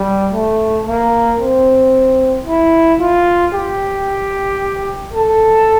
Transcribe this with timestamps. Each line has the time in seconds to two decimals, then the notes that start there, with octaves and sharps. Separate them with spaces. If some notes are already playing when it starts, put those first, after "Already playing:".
Already playing: G3
0.33 A3
0.87 A#3
1.40 C4
2.47 E4
3.00 F4
3.54 G4
5.14 A4